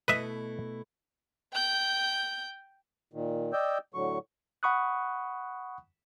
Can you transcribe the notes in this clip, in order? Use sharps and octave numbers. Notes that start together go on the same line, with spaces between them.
B2 A3 E4 B4 D#5 E5
G5 G6
A#2 D#3
D5 D#5 G5 E6 G6
A2 D3 F#3 C#6
F#5 B5 C#6 D#6 F#6